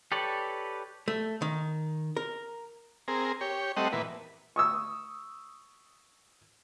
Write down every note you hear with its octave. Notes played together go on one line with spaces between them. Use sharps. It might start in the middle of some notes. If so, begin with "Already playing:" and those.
G4 A4 B4 C#5 D5
A3
D#3
A#4
C4 G#4 A#4
G4 C#5
G3 A3 C4 D#5 F#5
A#2 E3 B4
C#6 D#6 E6